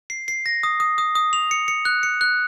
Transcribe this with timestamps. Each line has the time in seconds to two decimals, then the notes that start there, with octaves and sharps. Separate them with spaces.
0.10 C7
0.28 C7
0.46 A#6
0.63 D#6
0.80 D#6
0.98 D#6
1.15 D#6
1.33 F7
1.51 C#7
1.68 C#7
1.85 F#6
2.03 C#7
2.21 F#6